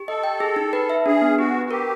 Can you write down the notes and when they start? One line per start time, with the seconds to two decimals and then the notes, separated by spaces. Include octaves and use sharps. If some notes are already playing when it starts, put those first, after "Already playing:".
Already playing: G4
0.08 A4 D#5
0.24 G5
0.40 G#4
0.56 D#4
0.73 B4
0.90 E5
1.06 D4 G#4
1.22 B3
1.38 F#4 G4
1.55 B4
1.66 F#4
1.71 G4 A#4